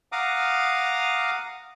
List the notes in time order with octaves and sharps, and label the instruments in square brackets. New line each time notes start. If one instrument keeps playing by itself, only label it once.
[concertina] F5 F#5 A#5 D6 D#6 F6